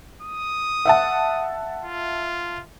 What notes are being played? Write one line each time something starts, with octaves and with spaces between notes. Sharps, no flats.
D#6
E5 F#5 A5
F4